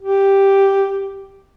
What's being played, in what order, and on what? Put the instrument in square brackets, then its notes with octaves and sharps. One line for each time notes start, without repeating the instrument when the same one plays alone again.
[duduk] G4